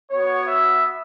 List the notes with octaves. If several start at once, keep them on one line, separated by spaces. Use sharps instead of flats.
B3 F#4 C#5
E5